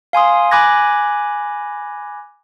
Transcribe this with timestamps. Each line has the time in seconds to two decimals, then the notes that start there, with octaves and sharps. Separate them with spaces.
0.13 F5 G#5 C6 D#6
0.51 G#5 B5 D6 F#6 G#6 A#6